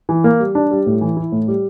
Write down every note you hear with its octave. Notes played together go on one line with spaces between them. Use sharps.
E3
A#3
G3
D4
G3
A2
E3
E4
A2
G3